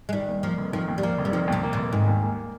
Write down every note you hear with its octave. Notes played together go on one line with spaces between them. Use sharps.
G#3
D#3 G3
D#2
F3 A#3
F1
D#3 F3
D#2
G3
F3 A#3
F1
G3
D#3 F3
D#2 C3
A#3
A#2
F1
G#2 D#3
D#2
A#3